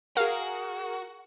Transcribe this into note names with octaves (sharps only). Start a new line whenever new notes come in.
F#4 G#4 A#4 F5